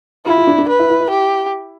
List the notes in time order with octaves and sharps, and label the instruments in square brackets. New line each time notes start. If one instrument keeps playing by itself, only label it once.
[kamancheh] E4 [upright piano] F4
[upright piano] F4
D4
D4
[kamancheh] B4
[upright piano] E4
E4
E4
[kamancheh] G4